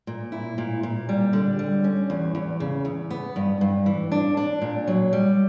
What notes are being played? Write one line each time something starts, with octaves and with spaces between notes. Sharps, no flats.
A#2
E4
A#2
A#2
G3
D3
G3
C#4
E2
E2
C#3
E2
B3
G2
G2
E3
D4
D4
A#2
F#3
G3